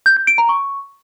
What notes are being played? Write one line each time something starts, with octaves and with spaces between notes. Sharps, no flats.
G6
G6
D7
A#5
C#6